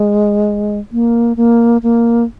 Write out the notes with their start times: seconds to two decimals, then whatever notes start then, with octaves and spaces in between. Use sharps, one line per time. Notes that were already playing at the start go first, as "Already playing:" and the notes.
Already playing: G#3
0.92 A#3
1.37 A#3
1.83 A#3